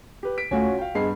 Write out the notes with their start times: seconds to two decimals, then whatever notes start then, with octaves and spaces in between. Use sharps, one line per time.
0.23 G4 B4
0.38 B6 D7
0.51 D2 A3 C#4 F4 F#4 G#5
0.67 C2
0.79 F5 G5
0.95 G2 G#3 B3 C7